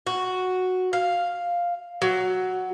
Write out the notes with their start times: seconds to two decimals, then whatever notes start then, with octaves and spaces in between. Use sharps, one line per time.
0.07 F#4
0.93 F5
2.02 F#3